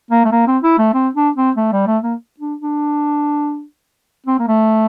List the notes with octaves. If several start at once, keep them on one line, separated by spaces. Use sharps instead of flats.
A#3
A3
A#3
C4
E4
A3
C4
D4
C4
A3
G3
A3
A#3
D4
D4
C4
A#3
A3